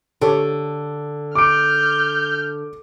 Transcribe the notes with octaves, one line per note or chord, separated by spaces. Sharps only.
D3 G4 A4 C#5
D6 F6 G6 D7